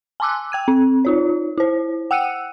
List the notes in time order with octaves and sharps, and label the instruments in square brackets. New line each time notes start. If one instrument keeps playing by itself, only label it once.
[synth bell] G#5 A5 C6 D6 E6 F#6
G5 G#6 D#7
C4
D#4 F4 C#5
E4 C5
F#5 G5 E6 F#6 C#7 D#7